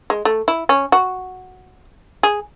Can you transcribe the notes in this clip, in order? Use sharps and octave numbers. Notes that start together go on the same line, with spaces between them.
G#3
A3
E4
C#4
F#4
G#4